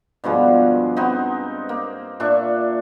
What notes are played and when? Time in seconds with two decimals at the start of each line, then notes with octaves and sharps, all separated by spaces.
0.24 G2 B2 F3 G#3
0.97 B3 C4 D#4
1.69 A#3
2.20 A#2 D4 E5 C#6